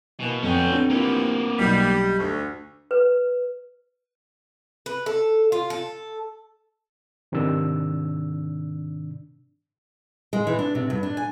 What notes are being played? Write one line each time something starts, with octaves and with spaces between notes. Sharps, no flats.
B2 E3 A#3
F2 B2 D3 F#3 C#4 G5
C4 D4
C3 E3 F3 A#3 B3
B1 G3
D2 C#6
B4
B4
A4
F4
A4
G#2 C3 D#3 D4 E6
G#3
E3
D4
C3
G2
D4
G#5